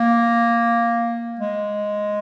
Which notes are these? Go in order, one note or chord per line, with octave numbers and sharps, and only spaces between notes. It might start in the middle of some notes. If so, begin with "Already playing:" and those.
Already playing: A#3
G#3